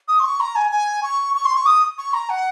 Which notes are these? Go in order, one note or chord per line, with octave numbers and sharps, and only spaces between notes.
D#6
C6
C#6
A#5
G#5
G#5
C#6
C#6
C6
C#6
D#6
C#6
A#5
F#5